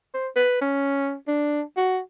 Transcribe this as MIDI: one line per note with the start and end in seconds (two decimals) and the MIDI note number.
0.14 0.29 72
0.36 0.58 71
0.61 1.15 61
1.28 1.62 62
1.77 1.99 66